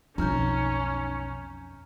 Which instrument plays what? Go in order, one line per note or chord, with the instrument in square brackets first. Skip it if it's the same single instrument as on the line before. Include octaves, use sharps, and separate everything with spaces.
[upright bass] B1 D#4 [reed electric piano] F2 [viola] C#4 [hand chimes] A#5 F6 G6